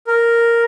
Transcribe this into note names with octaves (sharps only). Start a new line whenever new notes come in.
A#4